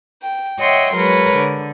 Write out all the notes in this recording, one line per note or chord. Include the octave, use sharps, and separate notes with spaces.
G5
C#5 D#5 E5 F#5 G5 C6
F#3 G#3 A#4 B4 C#5
D3